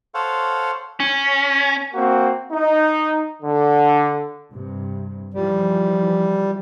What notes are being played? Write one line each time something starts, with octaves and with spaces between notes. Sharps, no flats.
A4 C5 C#5 F5 F#5
C#4
A#3 C4 F#4
D#4
D3
G2 C3
E3 F3 G3